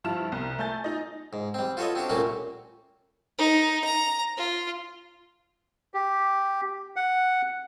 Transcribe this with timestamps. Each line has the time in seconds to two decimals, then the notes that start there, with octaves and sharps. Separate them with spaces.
0.04 G2 F3 E4 A5 F6 E7
0.32 C2
0.59 A3 E5 G#5 G6 A6
0.84 D#4 D#5
1.33 G#2
1.54 G3 C4
1.77 F4 F#4 A4 B4 C#5 D#5
1.95 C4 D4 F#4 G4
2.09 A#2 G3 A3 A#3 C#4 F#4
3.38 D#4
3.84 A#5
4.37 F4
5.94 G4
6.96 F#5